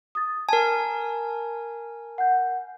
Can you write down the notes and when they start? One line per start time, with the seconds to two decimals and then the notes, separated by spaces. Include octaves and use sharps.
0.15 D#6 A6
0.49 A#4 G#5 A5
2.18 F#5 G6